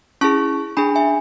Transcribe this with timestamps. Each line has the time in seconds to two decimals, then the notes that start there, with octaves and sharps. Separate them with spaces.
0.21 C#4 E4 G#4 A5 C#6
0.77 D4 G#4 G#5 B5
0.96 E5 G#5